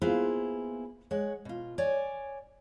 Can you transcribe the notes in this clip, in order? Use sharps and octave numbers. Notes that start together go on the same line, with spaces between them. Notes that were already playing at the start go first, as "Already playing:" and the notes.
A#3 B3 E4 F4 G#4 C5
G#3 C#5 F#5
B2 F4
C#5 D5 G#5